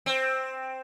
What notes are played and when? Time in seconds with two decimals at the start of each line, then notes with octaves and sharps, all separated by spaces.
0.06 C4